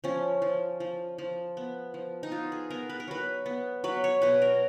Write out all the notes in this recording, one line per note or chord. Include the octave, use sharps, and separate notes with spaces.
F3 C#4
F3
F3
F3
B3
F3
D#4
B3 F4
G#4
B3 A#4
B4
A#4
F#3 B4
B3
F#3 B4
C#5
B2 B4
A#4